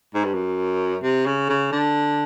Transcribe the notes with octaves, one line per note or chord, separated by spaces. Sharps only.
G#2
G2
F#2
C3
C#3
C#3
D3